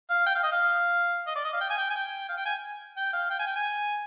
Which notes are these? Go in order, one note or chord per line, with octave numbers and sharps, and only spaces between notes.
F5
G5
F5
D#5
F5
D#5
D5
D#5
F5
G5
G#5
G5
G#5
G5
F5
G5
G#5
G5
F5
G5
G#5
G5
G#5